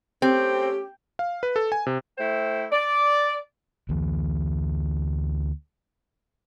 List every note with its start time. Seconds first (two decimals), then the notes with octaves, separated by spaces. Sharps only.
0.22 A3 C4 C#4 G4
1.19 F5
1.43 B4
1.56 A4
1.72 G#5
1.86 C3
2.18 A3 E4 C5 G5
2.71 D5
3.89 D2 E3